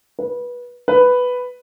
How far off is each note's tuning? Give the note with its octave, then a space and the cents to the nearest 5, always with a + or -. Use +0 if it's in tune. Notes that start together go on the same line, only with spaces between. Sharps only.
B4 -20
B4 +5